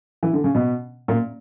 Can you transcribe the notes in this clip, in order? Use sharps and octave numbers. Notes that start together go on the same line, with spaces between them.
E3
D3
C#3
B2
A#2